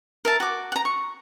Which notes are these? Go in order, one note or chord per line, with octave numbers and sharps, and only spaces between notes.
A#4 E5 A5
F#4 D6
F#5 A#5
C#6